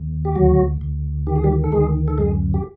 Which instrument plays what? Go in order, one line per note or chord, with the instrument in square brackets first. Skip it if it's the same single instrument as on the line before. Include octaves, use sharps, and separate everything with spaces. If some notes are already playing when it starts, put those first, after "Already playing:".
Already playing: [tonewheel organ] D#2
G4
D2 F#3 F#4
D2
D#3 G4
G#4
G3 G4
A4
D2 G#3 G#4
A4
F#2 G#3 G#4
G4